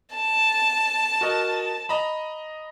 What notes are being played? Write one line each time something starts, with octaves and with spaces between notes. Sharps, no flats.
A5
F#4 A#4 D#5
D#5 A#5 B5